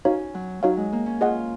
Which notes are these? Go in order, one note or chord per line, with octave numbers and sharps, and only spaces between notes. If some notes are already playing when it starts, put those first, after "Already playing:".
C#4 D#4 F#4 C#5 F5
F#3
F#3 D#4 F#4 C#5 F5
G#3
A#3
C#4
F4 G#4 D#5 F#5